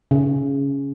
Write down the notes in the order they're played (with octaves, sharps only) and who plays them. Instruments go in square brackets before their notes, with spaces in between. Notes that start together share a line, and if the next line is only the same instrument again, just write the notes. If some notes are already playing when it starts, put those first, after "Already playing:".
[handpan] C#3